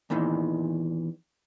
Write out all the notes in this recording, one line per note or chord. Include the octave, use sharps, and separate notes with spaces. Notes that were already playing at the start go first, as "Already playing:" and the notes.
E2 A#2 D#3 E3